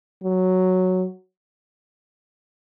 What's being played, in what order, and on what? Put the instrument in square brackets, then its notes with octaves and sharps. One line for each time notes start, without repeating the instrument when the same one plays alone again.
[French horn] F#3